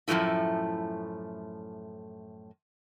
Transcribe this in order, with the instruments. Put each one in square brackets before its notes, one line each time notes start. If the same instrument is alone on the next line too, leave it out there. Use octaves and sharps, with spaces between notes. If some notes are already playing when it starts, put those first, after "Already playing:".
[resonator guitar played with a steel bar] F#2 A2 C#3 F3 A3 E4